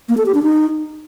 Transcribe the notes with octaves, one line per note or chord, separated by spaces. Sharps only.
A#3
A4
G4
D4
D#4